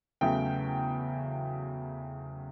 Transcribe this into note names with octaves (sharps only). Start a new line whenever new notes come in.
E2 C#3 F#3 A3 G5